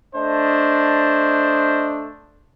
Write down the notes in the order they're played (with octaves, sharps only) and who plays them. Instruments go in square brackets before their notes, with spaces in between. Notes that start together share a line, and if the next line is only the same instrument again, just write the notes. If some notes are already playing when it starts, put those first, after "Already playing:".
[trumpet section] A3 D4 C5 D#5